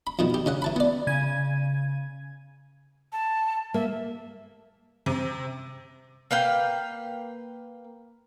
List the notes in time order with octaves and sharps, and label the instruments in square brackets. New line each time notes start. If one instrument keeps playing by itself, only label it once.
[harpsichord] B5
F2 B2 D#3 F3
G4
C#3 C#4 F#5
E3 A5 B5
B3 D5
[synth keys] C#3 G#6 D#7
[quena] A5
[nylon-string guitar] A#3 [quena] E5
[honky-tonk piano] C3
[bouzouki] A#3 B4 F5 G5